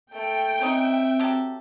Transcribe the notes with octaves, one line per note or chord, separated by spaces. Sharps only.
A3 G5
C4 C#4 D#4 E5
F#3 G4 A4